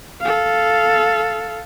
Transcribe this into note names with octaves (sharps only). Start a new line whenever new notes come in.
A4 F5